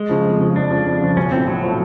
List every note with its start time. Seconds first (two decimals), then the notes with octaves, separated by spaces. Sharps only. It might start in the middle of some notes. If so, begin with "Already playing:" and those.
Already playing: G#3
0.09 C#3 F3
0.25 F2
0.40 C#3 F3
0.56 F2 D4
0.71 C#3 F3
0.87 F2
1.01 C#3 F3
1.16 B1 C#4
1.32 A2 F3 C4
1.47 B1 F#3
1.63 A2 F3